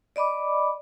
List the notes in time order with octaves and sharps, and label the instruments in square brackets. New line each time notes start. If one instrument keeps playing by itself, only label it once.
[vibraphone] D5 D#5 B5 D6